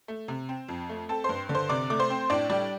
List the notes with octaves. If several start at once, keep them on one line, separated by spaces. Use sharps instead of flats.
A3
C3
C4
F2
A3
C4 A4 A5
G2 C5 C6
D3
C5 C6
C3 D5 D6
A3 D6
C5 C6
C4
A2 D4 D5
G3 D4 D5